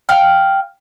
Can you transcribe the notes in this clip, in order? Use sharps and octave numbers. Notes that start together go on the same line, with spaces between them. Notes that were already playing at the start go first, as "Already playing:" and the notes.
F5 G5 F6